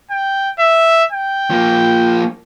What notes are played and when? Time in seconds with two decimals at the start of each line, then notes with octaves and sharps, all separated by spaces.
0.10 G5
0.59 E5
1.12 G5
1.51 F3 A#3